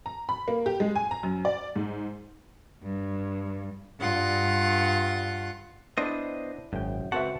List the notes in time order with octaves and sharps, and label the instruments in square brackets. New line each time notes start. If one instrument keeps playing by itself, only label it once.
[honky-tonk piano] A#5
B5
A#3
G4
G#3
G#5
A#5
F#2
D5
G#2
[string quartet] G2
G2 F4 F#5
[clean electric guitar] B3 C5 D#5 [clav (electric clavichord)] D4 [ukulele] E4 D5
[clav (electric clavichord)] G#1 G5 [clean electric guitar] F#2
[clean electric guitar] C#2 C4 F#5 [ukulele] F#4 B4 E5 [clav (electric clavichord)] A5